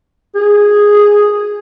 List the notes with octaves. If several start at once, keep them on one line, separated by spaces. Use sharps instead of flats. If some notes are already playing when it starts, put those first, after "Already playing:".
G#4